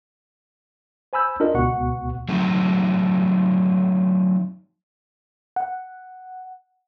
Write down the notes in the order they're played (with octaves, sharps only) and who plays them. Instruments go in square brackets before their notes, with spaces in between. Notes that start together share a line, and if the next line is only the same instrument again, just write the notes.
[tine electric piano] C5 G#5 B5 E6 G6
D4 F4 A#4 D#5
C#2 B2 F#5 C#6
[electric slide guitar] F#3 A3 C4 D#4
[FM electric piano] F#5